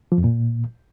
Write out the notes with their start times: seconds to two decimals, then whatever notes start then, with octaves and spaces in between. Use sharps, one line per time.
0.12 F3
0.18 F2
0.24 A#2